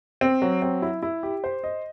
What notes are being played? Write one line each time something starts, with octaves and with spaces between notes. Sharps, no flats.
C4
F#3
C4
E4
E4
G4
C5
D#5